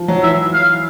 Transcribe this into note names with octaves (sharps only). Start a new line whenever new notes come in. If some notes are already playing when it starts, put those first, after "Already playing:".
Already playing: F3
F#3
E3 E5
F5